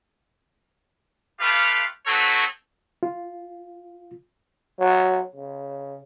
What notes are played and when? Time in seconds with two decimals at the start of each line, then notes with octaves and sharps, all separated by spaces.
1.39 A3 F4 G4 B4 F5
2.05 C4 D#4 F#4 A4 B4 C#5
3.03 F4
4.79 F#3
5.36 C#3